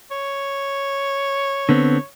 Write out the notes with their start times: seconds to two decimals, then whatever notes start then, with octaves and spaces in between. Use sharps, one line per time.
0.11 C#5
1.69 D3 B3 C4